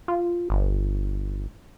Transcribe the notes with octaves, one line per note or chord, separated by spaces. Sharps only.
F4
G1